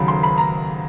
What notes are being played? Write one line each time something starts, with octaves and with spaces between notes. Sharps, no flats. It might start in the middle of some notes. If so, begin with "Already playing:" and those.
Already playing: D#2 C#3 F#3 B5
C6
B5
A#5